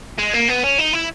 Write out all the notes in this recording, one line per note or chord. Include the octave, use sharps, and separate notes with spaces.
G#3
A#3
B3
C#4
D#4
E4